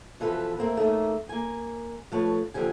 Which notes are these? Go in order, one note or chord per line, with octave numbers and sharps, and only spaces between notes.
B2 E3 F3 F4 A4 B4
A3 A#3 C4
C#3 A3 A#3 D#4
A#3 G#5
F3 A3 B4 C#5
D#2 D3 E3 F3 G4 G#5